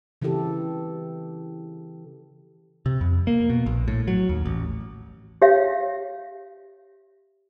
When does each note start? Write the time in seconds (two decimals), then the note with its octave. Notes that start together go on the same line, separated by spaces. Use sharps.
0.22 C#3 E3 C4 E4 G4 A4
2.86 C3
3.01 F2
3.27 A#3
3.50 B2
3.66 A#1
3.88 A2
4.08 F#3
4.29 D#2
4.46 A1
5.42 G4 C#5 E5 F5